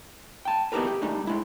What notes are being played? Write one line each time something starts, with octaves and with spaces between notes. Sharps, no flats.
G5 A5
B3 D#4 E4 G4 A#4 B4
G4
G3 A3 D4 D#4
G#3 E4